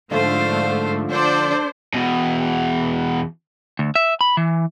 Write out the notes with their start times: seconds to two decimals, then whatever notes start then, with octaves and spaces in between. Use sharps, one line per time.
0.11 G#2 D3 F3 A3 C5 F5
1.10 D4 A4 C5 D5
1.94 E2 B2
3.79 D2
3.95 E5
4.21 B5
4.37 E3